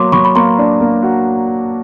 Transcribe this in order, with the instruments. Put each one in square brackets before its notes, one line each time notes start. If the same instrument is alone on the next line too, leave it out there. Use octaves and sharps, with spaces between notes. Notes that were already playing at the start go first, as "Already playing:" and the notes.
Already playing: [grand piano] F#3 A#3 [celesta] C6 D6
[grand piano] F#3 [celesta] B5 C#6
[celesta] B5
[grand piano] A#3 [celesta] A#5 C6
[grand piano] D4
A#3
F#4